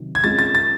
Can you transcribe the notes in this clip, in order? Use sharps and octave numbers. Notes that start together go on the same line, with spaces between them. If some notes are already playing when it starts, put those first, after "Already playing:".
Already playing: C3 D#3 F#3
G#6
G#3 C#4 F4 A6
A6
A6